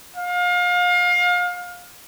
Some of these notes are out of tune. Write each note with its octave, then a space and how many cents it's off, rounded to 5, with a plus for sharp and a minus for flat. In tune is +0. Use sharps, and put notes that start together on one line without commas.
F5 +30